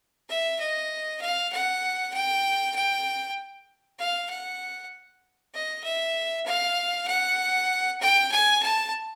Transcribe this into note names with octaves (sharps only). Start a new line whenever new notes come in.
E5
D#5
F5
F#5
G5
G5
F5
F#5
D#5
E5
F5
F#5
G5
G#5
A5